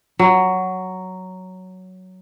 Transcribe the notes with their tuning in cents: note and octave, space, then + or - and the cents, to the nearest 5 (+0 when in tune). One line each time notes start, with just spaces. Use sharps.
F#3 +5